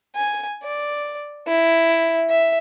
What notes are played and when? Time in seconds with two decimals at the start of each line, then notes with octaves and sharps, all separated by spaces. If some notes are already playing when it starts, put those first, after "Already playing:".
0.16 G#5
0.63 D5
1.47 E4
2.29 E5